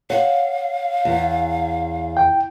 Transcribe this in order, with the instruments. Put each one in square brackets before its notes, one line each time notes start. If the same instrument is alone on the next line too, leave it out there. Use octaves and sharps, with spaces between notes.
[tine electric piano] C#5 [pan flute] F5 [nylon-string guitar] F#5
[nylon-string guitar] E2
[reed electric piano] G5